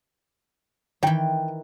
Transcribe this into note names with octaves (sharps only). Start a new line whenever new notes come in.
D#3 E3 G5